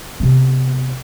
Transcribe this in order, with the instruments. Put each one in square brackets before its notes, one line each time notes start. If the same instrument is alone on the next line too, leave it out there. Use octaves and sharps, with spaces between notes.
[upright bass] C3 B3